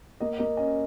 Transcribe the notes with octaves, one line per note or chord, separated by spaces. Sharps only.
A#3 D#5
A#3 D#5
C#4 D#5